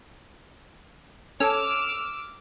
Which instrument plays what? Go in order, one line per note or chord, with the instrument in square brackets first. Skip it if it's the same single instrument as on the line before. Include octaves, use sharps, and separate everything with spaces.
[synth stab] C#4 A4 [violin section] D6 E6 F6